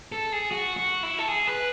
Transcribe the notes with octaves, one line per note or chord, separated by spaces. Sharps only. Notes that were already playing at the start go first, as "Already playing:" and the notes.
A4
G#4
F#4
F#4
E4
A4
G#4
B4